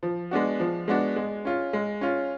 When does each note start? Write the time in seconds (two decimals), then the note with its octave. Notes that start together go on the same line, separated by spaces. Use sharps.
0.03 F3
0.31 G#3 B3 D4 F#4
0.60 F3
0.88 G#3 B3 D4 F#4
1.16 G#3
1.45 C#4 F4
1.73 G#3
2.01 C#4 F4